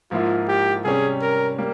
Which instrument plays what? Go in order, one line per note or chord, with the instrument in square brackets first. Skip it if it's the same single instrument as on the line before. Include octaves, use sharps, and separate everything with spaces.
[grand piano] G#2 F3 A#3 E4 [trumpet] F4
[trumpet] G4
[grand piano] C3 G3 C#4 [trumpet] G#4
[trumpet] A#4
[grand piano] G3 A#3